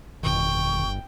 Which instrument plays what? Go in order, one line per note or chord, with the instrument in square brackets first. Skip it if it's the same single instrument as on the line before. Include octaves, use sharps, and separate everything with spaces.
[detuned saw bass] G1 [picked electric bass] F2 B2 D#3 [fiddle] G5 [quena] C#6